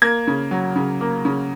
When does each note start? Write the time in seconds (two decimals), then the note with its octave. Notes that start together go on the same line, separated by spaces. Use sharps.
0.02 A#3 G#6
0.27 C#3
0.51 F#3
0.76 C#3
1.01 A#3
1.25 C#3